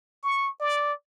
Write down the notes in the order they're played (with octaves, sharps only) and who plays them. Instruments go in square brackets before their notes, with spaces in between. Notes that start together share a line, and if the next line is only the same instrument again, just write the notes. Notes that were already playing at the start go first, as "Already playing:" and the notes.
[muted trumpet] C#6
D5